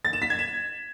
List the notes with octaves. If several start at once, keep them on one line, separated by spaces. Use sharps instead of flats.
A6
E7
B6
G#6
E7